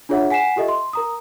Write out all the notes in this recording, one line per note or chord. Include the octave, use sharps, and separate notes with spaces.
D4 F4 G#4 C#5 E5 F#5
F#5 G#5 B6 C7 E7
F4 G4 A4 D#5 E5
C6
A#4 A#5 D#6